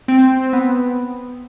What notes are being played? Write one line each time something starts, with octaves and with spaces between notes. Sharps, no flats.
C4
B3